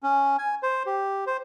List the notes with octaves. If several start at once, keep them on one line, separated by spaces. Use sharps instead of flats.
C#4
G#5
C5
G4
C5